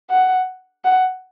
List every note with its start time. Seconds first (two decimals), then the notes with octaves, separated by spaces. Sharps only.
0.10 F#5
0.84 F#5